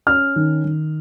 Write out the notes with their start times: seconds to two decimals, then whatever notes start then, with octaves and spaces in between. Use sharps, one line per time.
0.07 C#4 F6
0.36 D#3
0.64 D#3